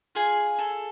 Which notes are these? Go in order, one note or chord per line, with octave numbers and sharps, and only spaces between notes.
F4 G#4 G#5
A4